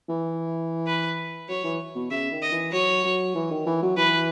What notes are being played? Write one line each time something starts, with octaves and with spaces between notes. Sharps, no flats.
E3
B4
F#3 C#5
E3
B2
C#3 E5
D#3
D#5
E3
F#3 C#5
F#3
E3
D#3
E3
F#3
E3 B4